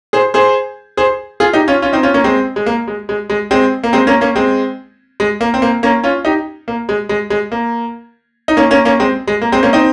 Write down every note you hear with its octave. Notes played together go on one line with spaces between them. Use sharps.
G#4 C5
G#4 C5
G#4 C5
F4 G#4
D#4 G4
C#4 F4
C#4 F4
C4 D#4
C#4 F4
A#3 C#4
G#3 C4
G#3
A#3
G#3
G#3
G#3
G#3 C4
A#3
G#3 C4
A#3 C#4
A#3 C#4
G#3 C4
G#3
A#3
C4
A#3
A#3 C#4
C#4 F4
D#4 G4
A#3
G#3
G#3
G#3
A#3
D#4
A#3 C#4
A#3 C#4
A#3 C#4
G#3 C4
G#3
A#3
G#3 C4
A#3 C#4
C4 D#4